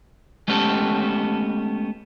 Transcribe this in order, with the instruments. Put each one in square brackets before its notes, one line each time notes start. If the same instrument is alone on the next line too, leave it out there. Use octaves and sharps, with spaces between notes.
[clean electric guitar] G#3 A3 B3 C#4 G4 A4